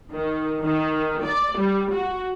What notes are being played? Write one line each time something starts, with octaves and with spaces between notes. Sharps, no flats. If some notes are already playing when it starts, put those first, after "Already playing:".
D#3
D#3
D5
G3
F#4